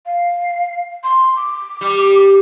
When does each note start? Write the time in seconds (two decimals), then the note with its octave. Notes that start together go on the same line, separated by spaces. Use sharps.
0.06 F5
1.04 C6
1.36 D6
1.81 G3